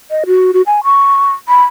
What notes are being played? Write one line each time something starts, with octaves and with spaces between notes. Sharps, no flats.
D#5
F#4
F#4
G#5
C#6
B5